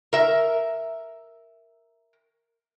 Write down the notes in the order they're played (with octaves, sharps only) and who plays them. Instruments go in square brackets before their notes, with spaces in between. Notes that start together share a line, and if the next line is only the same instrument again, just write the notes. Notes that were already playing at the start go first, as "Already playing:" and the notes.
[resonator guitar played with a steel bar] A#4 E5